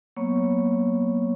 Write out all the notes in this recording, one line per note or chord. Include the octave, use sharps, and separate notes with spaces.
F#3 A#3 B3 C#5 C#6